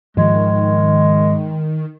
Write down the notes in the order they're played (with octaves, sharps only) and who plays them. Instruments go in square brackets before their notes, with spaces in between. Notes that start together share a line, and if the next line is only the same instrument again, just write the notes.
[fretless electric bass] G#2 F3 [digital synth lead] D#3 [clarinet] G#3